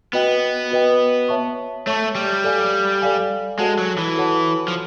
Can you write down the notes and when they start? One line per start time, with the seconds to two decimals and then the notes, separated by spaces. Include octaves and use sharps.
0.13 B3 F#4 B4 D#5 G5
0.71 F#4 B4 D#5 G5
1.29 C#5 E5 A5 C#6
1.87 A3 C#5 E5 A5 C#6
2.15 G3
2.44 A4 D5 F5 G#5
3.02 A4 D5 F5 G#5
3.59 G#3 F#4 A4 C#5 F#5 A5
3.78 F#3
3.98 E3
4.17 F#4 A4 C#5 F#5 A5
4.68 F3